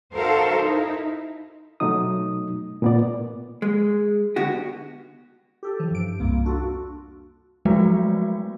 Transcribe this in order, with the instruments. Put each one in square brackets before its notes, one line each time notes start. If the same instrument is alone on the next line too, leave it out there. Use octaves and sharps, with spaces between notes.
[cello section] D#4 F#4 A4 A#4 C5 F5
D#4 E4
[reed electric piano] B2 F#3 A3 D#4 D#6
A#2 B3 D5
[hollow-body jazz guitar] G#3
D3 B3 F#4 G4
[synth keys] G4 A4
E3 F3
G2 D7
C2 F2 A#3
A#3 D4 F4 F#4 A4
[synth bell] F3 F#3 G#3 A3 B3 F#4